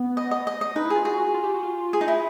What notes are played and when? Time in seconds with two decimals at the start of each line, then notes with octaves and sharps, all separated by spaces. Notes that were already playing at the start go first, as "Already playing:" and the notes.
Already playing: B3
0.17 D#5
0.31 D#5
0.47 D#5
0.61 D#5
0.76 D#4 B4
0.85 E4
0.90 G#4
0.95 F4
1.05 F#4 G#4
1.34 F4
1.44 G4
1.54 F#4
1.63 F4
1.93 G#4
2.01 D#4
2.08 E4